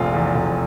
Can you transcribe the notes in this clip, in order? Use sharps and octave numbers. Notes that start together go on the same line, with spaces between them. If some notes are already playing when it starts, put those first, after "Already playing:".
Already playing: F1 A#1 F4
E2
F1